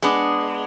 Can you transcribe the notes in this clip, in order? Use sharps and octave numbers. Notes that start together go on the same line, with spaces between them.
G#3 B3 D4